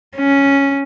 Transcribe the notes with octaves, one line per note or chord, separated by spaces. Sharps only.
C#4